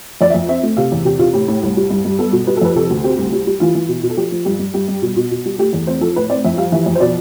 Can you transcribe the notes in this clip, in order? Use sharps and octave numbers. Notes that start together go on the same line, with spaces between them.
F2 D5
E5
F2
C4 E5
A3
C3 F5
E2
C3 G4
C3 F4
A2 G4
A2
C2
G3
G2
G2
B3 A4
B2
G3 B4
A4
F2 B4
C3 A4
D2
C4 G4
C2
G3
G3
E3 F4
E3
B2
B2
A4
F3 G4
F3
G2 G4
G2
G2 G4
G2
B2
B2
B2
G3
A3 G4
E2
C4 C5
F3 A4
A2 B4
C4 D5
F2 E5
G3 F5
E3 E5
F2
C5
B2 D5